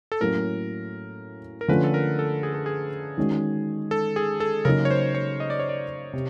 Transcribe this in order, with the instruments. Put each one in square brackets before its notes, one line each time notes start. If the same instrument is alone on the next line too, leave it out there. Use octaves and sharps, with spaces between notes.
[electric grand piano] A4
[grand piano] A2 F#3 A#3 C#4 F#4 [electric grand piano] A#4
[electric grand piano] A#4
[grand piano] D3 F3 A3 C#4 [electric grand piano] B4
[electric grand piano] A4
A#4
A4
G#4
A4
G#4
[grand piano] D#3 G#3 C#4 F#4
[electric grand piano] A4
G#4
A4
[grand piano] C#3 F#3 A#3 D#4 [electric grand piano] A#4
[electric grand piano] C#5
C5
C#5
D#5
D5
C#5
D5
[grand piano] C3